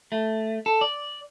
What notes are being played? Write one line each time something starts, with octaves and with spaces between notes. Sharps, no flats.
A3
A4
D5